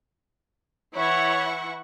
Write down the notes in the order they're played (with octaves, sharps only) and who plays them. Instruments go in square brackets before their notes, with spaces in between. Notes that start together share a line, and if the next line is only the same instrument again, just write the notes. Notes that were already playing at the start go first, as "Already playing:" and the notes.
[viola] E3 F#5 [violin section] E4 C#6 [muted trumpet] C#5